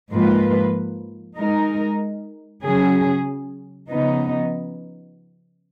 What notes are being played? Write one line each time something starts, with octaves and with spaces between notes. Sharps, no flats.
G#2 F3 A#3 F4 B4
G#3 D#4 A#4
C#3 F#3 C#4 G#4
C#3 F3 B3 D#4